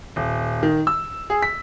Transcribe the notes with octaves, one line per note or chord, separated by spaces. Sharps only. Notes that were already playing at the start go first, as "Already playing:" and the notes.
D#1
D#3
E6
G#4
B6